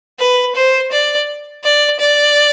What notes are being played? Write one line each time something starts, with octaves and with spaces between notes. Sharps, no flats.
B4
C5
D5
D5
D5